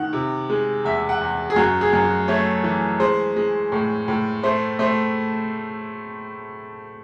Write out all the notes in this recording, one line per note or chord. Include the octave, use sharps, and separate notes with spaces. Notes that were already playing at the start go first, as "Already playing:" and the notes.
Already playing: D#3 F#5
C3
G#3
E2 E5
F#5
E2
G#4
F#2 F#4
G#4
F#2
F#4
A3 C#5
E3
G#3 C5
G#3
A2
A2
A3 C5
A3 C5